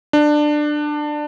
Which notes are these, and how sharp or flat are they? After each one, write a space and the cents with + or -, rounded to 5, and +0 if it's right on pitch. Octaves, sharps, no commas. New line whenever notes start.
D4 +20